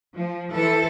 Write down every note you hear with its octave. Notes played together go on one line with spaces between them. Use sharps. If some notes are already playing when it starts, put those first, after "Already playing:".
F3
E3 A4 C5